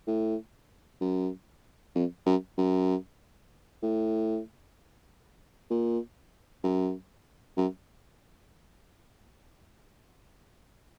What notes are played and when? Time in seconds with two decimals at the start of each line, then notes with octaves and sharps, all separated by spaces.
0.07 A2
1.01 F#2
1.96 F2
2.26 F#2
2.58 F#2
3.83 A2
5.70 A#2
6.64 F#2
7.57 F#2